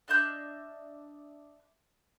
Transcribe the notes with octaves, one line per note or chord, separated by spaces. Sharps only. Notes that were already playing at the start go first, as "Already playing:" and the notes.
D4 D#5 E5 G6